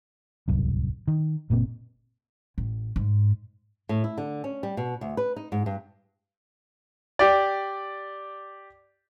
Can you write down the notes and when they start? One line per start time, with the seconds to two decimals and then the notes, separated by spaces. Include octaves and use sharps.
0.48 D1 C2 F#2
1.08 D#3
1.50 F#1 A#2 A#3 C4
2.58 A1
2.96 G#2
3.89 A2
4.04 E4
4.18 D3
4.44 C#4
4.63 G3
4.77 B2
5.01 D2
5.17 B4
5.36 D#4
5.52 G#2
5.66 G2
7.19 G4 D5